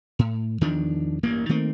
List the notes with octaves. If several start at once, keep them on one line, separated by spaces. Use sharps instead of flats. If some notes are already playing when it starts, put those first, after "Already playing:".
A2
E2 D#3 F3 D4
A1 G2 A#3
D#3 A3 A#3 C4